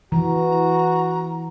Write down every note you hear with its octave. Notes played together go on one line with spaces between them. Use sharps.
E3 F#4 A#5